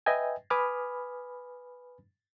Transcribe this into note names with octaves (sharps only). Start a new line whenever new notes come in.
B4 D#5 E5 G5 G#5
B4 G#5 B5 D6 D#6 F6